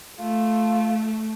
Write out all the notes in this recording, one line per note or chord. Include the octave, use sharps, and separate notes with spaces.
A3 F4